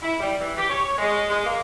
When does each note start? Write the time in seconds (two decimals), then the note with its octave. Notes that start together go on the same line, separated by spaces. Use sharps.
0.01 E4
0.19 G3
0.39 E3
0.56 G4
0.68 C#5
0.98 G#3
1.29 G#3
1.44 A#3